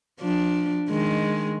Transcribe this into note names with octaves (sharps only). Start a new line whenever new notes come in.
F3 D4
D#3 G#3